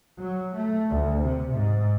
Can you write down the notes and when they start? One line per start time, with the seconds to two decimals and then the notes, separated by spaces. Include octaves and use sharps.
0.19 F#3
0.55 A3
0.90 D2
1.23 C3
1.53 G#2